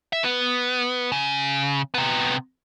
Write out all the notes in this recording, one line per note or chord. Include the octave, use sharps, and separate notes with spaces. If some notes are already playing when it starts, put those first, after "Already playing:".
E5
B3
C#3
C3 B3